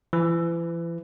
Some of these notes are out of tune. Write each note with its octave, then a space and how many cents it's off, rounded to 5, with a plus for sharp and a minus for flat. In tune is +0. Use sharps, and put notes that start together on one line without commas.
E3 +35